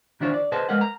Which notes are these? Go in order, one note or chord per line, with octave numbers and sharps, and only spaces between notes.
D#3 D4 E4 F4 C5 C#5
D5
G#4 B4 C5 D#5 A5
G#3 A#4 B4 D#5 F5 F#5
A#5